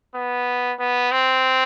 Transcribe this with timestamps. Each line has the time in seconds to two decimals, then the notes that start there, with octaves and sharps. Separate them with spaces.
0.15 B3
0.79 B3
1.12 C4